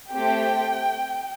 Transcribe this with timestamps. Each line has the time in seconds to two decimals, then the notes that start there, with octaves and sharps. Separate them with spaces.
0.11 A3 C4 G4 G5